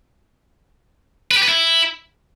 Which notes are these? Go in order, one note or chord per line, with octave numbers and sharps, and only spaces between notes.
B4
G4
B4
E4